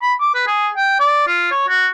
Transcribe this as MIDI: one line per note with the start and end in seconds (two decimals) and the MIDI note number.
0.02 0.14 83
0.21 0.31 86
0.34 0.44 71
0.47 0.69 68
0.77 0.96 79
1.00 1.25 74
1.27 1.47 65
1.51 1.65 73
1.69 1.89 66